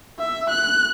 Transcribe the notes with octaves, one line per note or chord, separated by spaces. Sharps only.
E5
F#6